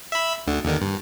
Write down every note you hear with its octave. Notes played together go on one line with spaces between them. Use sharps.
E5 B5
D2 D3
D#2 D3 D#3
G2